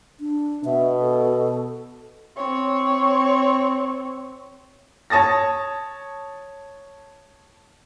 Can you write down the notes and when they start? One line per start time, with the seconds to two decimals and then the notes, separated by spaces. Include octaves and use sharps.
0.20 D4
0.65 B2 E5
1.00 A4
2.37 C4 C#5
5.10 C#5 A5 D#6 A6 A#6